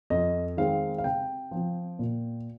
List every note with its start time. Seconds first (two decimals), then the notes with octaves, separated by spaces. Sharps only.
0.10 F2 D#5
0.57 D#3 G#3 C4 F5
0.98 F5
1.04 C3 G5
1.51 F3 C4
1.99 A#2